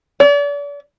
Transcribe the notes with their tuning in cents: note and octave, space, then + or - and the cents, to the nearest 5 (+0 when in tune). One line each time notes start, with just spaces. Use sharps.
D5 -40